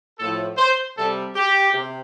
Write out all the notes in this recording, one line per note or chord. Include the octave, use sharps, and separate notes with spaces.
A2 F3 A4
C5
C3 G3 A4
G4
C3